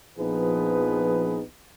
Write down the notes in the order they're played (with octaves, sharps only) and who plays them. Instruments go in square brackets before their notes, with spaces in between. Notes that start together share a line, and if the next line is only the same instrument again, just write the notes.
[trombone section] A#1 F3 B3 D#4 G#4 B4